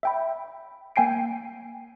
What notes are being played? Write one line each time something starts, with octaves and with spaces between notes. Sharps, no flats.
E5 G5 B5
A#3 G5 G#5 C7 D7